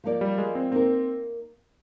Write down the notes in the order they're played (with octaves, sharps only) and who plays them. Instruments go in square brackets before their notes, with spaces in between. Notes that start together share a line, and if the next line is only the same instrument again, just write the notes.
[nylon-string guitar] F3 A#3 D#4 A#4 D5
[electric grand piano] G3
G#3
C4
[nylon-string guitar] A#3 D#4 A#4 [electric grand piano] C4